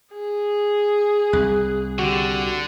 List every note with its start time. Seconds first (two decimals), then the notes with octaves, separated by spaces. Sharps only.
0.13 G#4
1.33 C2 F#6
1.99 D3 F#4 G4